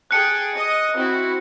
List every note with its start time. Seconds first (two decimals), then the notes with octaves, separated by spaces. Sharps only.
0.11 G#4 G5 A5 F#6 C#7
0.55 D#5 D#6
0.96 C4 E4 F#4